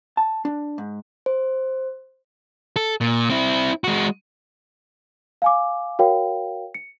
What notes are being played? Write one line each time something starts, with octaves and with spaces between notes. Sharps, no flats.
A5
D4
G#2
C5
A4
A#2
C4 E4
G#3 F#4
F5 G#5 D6
F#4 A#4 C#5 F5 G5
C#7